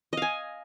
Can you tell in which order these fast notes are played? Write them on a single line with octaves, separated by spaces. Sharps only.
D#5 F5 G#5